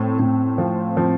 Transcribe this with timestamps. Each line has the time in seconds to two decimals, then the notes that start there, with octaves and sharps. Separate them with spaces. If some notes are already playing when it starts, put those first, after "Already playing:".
Already playing: A2 C4
0.19 A2
0.58 F3
0.97 F3